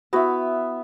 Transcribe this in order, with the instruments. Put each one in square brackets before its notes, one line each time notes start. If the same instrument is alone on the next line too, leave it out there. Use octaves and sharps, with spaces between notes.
[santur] B3 E5 [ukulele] E4 F#4